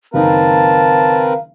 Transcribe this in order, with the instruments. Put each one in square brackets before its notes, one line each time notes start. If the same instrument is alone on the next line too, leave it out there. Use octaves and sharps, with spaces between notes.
[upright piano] F#1 D#3 D#4 [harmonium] C4 A#4 B4 [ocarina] F5 [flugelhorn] A5